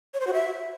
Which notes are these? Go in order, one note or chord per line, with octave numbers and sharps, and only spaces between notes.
C#5
C5
F#4
E5